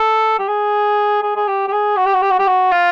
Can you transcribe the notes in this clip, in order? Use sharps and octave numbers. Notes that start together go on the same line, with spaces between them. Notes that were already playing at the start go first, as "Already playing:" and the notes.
Already playing: A4
G4
G#4
G#4
G#4
G4
G4
G#4
F#4
G4
F#4
G4
F#4
G4
F#4
F4